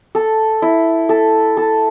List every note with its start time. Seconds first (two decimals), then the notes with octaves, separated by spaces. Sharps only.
0.15 A4
0.62 E4
1.09 A4
1.57 A4